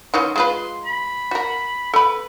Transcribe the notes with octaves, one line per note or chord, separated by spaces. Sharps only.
D#3 E3 C#4 C6
G#3 F4 B4 C6
B5
F#4 A#4
A4 B4 B5